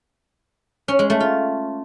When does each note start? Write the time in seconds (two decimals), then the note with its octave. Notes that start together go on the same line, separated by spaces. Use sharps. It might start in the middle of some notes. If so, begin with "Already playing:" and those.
0.88 C#4
0.99 G#3
1.10 A3
1.20 F4